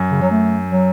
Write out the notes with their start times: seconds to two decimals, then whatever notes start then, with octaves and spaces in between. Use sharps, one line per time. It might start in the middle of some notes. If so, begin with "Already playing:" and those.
Already playing: F#2
0.11 C#3
0.21 F#3
0.31 A3
0.70 F#3